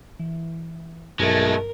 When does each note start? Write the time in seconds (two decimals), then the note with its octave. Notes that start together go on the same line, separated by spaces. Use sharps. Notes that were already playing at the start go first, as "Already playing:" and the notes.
0.19 E3
1.19 B1 G2 G#3 A3 A#4